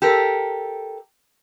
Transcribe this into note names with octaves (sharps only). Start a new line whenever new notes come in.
G4 A4 A#4